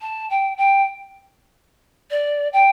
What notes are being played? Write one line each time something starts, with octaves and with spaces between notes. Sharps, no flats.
A5
G5
G5
D5
G5